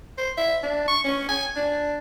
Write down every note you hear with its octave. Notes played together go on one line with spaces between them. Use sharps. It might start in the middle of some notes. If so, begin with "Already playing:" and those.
C5
E5
D4
C#6
C#4
G#5
D4